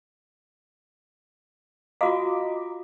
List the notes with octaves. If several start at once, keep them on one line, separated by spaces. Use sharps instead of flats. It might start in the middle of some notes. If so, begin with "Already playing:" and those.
F4 F#4 D#5 F5 A#5 D6